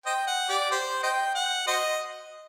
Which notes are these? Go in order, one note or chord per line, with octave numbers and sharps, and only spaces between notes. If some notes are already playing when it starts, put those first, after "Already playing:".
C5 D#5 G5
F#5
G4 D5
G4 C5
C5 D#5 G5
F#5
F#4 C5 D#5